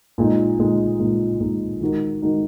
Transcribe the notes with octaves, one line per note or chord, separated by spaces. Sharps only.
A#2 G#3 D#4
A#2 G#3 D#4
A#2 G#3 D#4
A#2 G#3 D#4
D#3 G#3 D#4 F#4 A#4
D#3 G#3 D#4 F#4 A#4